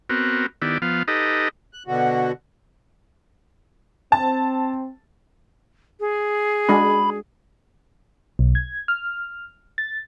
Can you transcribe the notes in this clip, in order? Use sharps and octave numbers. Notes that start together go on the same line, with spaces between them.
B3 C4 F#4 A#4
D#3 B3 E4 G4 D5
F3 B3 F5
D#4 G4 A4 B4 D#5
F#6
B2 D3 F#4
C4 A5
G#4
G#3 D4 F#4 B5
B1
G#6
F6
A6